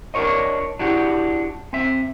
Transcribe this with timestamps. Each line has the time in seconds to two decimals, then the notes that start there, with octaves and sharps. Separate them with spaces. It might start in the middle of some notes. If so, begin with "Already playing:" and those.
0.14 D4 F4 A#4 C#5 D#5
0.79 D4 E4 F#4 G4
1.73 C4 E5